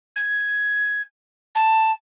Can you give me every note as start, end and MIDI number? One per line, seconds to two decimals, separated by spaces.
0.15 1.01 92
1.54 1.91 81